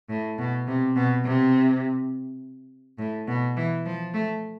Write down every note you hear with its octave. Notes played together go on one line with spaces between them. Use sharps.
A2
B2
C3
B2
C3
A2
B2
E3
F3
A3